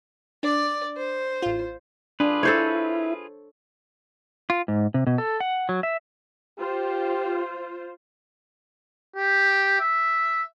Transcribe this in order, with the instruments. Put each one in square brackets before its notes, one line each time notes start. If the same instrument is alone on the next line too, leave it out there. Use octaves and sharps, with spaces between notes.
[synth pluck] D4 [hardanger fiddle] D5
[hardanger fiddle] C5
[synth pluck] A1 F4
[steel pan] D4 [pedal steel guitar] F4 G#4 B4
[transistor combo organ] E4 [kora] A4 C5 C#5
[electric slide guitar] F4
G#2
C3
B2
A4
F#5
F#3
E5
[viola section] F4 C5 [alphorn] G4
[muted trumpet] G4
E5